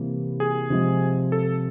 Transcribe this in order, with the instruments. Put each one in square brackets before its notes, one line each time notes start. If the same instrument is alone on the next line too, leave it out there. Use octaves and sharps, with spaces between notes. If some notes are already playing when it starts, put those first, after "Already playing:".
Already playing: [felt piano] C3 E3 G3 A#3
[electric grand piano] G#4
[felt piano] C3 F3 G#3
[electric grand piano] A4